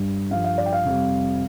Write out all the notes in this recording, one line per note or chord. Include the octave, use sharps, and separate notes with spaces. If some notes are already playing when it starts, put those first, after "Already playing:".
Already playing: G2 G3
G2 F3 F5
F5
D5
G5
F5
F2 C3 G3